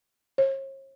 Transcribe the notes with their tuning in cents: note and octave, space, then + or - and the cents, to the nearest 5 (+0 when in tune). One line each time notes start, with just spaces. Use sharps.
C#5 -45